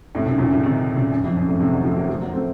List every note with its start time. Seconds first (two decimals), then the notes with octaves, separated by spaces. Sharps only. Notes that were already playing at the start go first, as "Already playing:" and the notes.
0.15 A2 C3
0.26 F#2 A#2
0.38 F#2 A#2
0.51 A#2 C#3
0.63 C3 D#3
0.96 A#2 C#3
1.12 F#2
1.24 F2
1.37 F#2
1.48 F2 A2
1.60 A2 C3
1.72 D#3 F#3
1.85 F3 A3
1.96 F#3 A#3
2.09 F3 A3
2.22 F#3 A#3
2.33 A3 C4